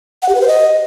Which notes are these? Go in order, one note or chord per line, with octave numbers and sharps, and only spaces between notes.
F#5
G4
B4
C5
D#5